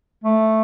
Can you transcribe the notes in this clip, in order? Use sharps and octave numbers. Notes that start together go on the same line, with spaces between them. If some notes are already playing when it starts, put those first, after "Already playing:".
A3